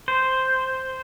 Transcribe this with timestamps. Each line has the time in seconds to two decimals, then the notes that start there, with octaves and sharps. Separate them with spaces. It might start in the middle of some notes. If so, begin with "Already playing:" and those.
0.08 C5